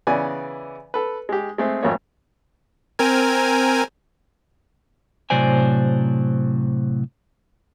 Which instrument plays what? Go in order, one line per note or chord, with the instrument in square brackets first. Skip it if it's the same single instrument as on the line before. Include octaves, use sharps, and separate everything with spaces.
[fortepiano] C#3 E3 B3 D5 G#5
A4 B4
G#3 G4
G#3 A3 C4
G#1 F2 A3 A#3 C#5
[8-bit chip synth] C4 A#4 G#5
[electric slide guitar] A2 C3 F#3 C5 D5 G#5